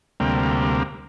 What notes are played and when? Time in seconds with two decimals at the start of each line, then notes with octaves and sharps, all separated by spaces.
0.20 D2 C3 G3 A#3